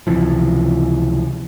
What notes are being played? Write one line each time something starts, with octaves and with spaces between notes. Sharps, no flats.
C#2 C3 E3 F3